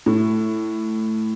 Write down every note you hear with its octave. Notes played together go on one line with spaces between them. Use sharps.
A2